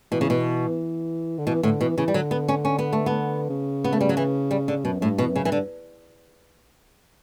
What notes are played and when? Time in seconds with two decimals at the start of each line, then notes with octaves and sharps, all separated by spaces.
0.12 B2 E3
0.21 C#3
0.30 B2
1.38 D3
1.46 B2 E3
1.63 A2 D3
1.81 B2 E3
1.97 C#3 E3
2.08 G3
2.14 D3 F#3
2.31 B3
2.48 C#4
2.65 C#4
2.79 B3
2.93 A3
3.06 B3
3.50 C#3
3.84 B3
3.93 A3
4.01 G3
4.09 F#3
4.17 E3
4.51 G3
4.68 D3
4.85 F#2 B2
5.00 F#2 A2
5.07 G2
5.18 B2
5.23 E2
5.30 F#2
5.36 C#3
5.45 E3
5.52 G2 D3